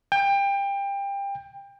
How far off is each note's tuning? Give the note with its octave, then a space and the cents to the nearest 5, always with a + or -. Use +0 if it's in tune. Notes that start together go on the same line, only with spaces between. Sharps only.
G5 +25